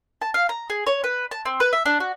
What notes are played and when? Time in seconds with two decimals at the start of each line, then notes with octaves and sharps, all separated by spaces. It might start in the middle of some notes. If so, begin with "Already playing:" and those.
0.22 A5
0.34 F5
0.49 A#5
0.70 G#4
0.87 C#5
1.04 B4
1.31 A5
1.45 C4
1.60 B4
1.73 E5
1.86 D4
2.00 F#4